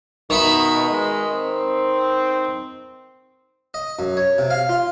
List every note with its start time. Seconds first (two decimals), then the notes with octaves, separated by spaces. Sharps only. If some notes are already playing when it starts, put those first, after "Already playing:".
0.30 B2 D#3 E5 B5
0.91 G#3
1.33 C4
3.74 D#5
3.99 F#2
4.17 C#5
4.38 C3
4.50 F5
4.69 F4